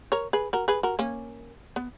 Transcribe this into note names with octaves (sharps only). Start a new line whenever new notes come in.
A#4 C#5
G#4 B4
F#4 A#4
G#4 B4
F#4 A#4
A#3 C#4
B3